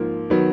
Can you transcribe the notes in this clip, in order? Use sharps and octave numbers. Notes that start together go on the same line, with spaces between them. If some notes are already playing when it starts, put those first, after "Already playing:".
Already playing: G#2 F3 A#3
D#3 F#3 B3